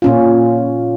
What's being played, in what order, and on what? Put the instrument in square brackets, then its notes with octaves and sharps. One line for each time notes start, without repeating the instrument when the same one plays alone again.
[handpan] A#2 C#4 F4